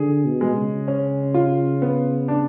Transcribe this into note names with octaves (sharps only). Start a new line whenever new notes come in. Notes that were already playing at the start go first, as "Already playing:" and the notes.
Already playing: D3 G#4
B2
G#3
C#3
C#4
F4
B3
D4